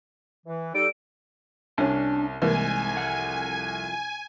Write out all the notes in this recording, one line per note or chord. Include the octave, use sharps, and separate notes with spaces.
E3
G3 D#4 A4 D7
C2 C#4 D4 G#5 A5
C2 G#2 E3 A#3 A#4 G#5
F2 F#5